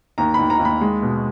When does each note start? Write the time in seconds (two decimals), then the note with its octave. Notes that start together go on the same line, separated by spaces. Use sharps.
0.18 D#2 A#5
0.34 D#2 B5
0.50 A#5
0.59 D#2
0.65 B5
0.81 G#3
1.02 B2